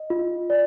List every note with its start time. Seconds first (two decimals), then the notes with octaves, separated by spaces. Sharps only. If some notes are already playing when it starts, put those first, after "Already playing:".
Already playing: D#5
0.10 F4
0.50 D5